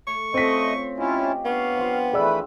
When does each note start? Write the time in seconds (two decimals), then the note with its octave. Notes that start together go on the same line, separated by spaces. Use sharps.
0.07 A3 C#6
0.34 A3 C4 C#4 F4 C5 D#5 B6
0.97 C#4 E4 F4 G4 D#5
1.45 B3 D4 C#5 F5
1.77 F3 C4 F4
2.13 E3 A3 G#4 B4 D5 E6